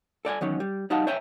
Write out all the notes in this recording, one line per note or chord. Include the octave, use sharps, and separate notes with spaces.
A4 D5 G5 G#5
E2 D#3 F#3 C#4
G3
G3 D#4 F#4 F5 F#5 A5
C5 C#5 E5 G5 G#5 A#5